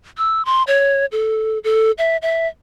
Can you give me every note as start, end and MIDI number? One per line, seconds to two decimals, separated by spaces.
0.18 0.44 88
0.45 0.63 84
0.67 1.06 73
1.12 1.59 69
1.64 1.91 69
1.98 2.17 76
2.22 2.48 76